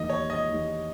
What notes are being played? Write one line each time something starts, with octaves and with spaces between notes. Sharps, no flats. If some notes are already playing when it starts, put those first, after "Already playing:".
Already playing: E2 D#3 A#3 D#4 G4 D#5
C#5
D#5
E2 D#3 A#3 D#4 G4